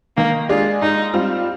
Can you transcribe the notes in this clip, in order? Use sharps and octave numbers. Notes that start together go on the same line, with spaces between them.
D#3 A#3
G#3 D4 F4 G#4
G#2 D#4
G3 C4 F4